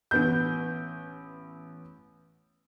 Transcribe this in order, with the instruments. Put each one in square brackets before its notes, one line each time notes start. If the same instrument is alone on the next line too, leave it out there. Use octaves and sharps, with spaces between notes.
[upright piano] A1 B3 G6